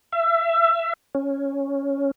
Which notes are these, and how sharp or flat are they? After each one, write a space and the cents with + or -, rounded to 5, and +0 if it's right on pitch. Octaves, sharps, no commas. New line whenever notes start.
E5 +25
C#4 +0